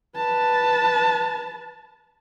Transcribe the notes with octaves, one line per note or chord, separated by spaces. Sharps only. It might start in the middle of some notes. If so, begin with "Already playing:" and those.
B4 A5